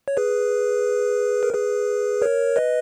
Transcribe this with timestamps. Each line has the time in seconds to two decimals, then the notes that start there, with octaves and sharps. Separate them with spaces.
0.08 C#5
0.17 G#4 B4
1.43 A#4
1.54 G#4 B4
2.22 A#4 C#5
2.56 B4 D#5